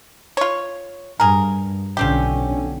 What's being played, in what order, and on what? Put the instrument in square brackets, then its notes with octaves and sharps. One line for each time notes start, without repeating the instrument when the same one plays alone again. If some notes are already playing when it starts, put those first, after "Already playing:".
[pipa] F4 C#5
[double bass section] G2 [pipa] G#4 A#4
[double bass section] B1 D3 C#4 [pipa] F3 C4 G4